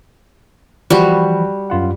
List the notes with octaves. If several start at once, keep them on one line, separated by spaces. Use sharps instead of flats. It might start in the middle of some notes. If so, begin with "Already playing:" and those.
E3 F3 G3 F#4 B5
F#2 F4 F#5